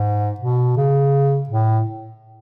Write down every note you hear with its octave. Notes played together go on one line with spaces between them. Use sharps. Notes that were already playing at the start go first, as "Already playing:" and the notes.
Already playing: G#2
B2
C#3
A2